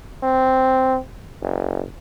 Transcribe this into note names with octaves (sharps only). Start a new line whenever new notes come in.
C4
F#1